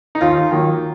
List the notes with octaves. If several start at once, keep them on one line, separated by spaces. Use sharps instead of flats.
D#4
D#2 F4
D#3 F#3 A#3